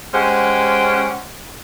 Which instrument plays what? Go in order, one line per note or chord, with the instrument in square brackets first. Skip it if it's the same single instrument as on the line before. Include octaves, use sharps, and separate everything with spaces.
[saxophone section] G#3 C#4 G4 C5 F#5